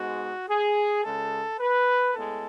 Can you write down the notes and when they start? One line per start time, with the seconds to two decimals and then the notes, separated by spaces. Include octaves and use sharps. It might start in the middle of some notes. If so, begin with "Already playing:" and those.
Already playing: G#2 G#3 B3 F#4
0.49 G#4
1.03 C#2 C#3 G#3 A4
1.59 B4
2.14 A2 G#3 B3 A4